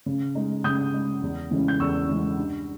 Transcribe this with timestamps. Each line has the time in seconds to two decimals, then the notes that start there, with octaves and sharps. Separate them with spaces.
0.06 C#3
0.35 G#3 D#4
0.64 C#3 D#6 G6
0.93 G#3 D#4
1.22 E2
1.51 C#3 E3 G#3 C#4
1.68 G6
1.79 E2 C#6 E6
2.09 C#3 E3 G#3 C#4
2.37 G2